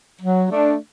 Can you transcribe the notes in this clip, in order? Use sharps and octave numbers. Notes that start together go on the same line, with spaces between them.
F#3
A3 D4